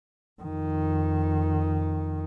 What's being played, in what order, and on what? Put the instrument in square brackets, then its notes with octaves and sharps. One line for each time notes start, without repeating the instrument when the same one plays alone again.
[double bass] F2 D#3